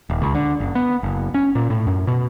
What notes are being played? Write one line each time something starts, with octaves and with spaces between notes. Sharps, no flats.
D#1
C#2
D3
F#1
B3
F#1
C#4
A#2
A2
F#2
B2